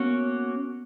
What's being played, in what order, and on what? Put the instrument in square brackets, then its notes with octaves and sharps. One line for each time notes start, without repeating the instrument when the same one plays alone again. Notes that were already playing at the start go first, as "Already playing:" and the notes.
Already playing: [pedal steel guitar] A#3 C#4 F#4 C#5 [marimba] B3